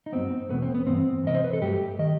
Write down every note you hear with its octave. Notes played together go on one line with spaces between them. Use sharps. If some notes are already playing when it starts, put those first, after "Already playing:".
D#4
G2 F#3 B3 C4
E2 B2 A3 B3
C4
B3
G2 E3 B3 C4
E2 C3 E3 A3 D#5
C5
B4
A4
G2 F#3 A3 G4
D#3 D#5